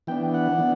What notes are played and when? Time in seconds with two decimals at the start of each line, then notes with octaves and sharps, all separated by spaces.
0.07 E3 B3 D4 G5
0.34 F#5
0.58 E3 B3 D4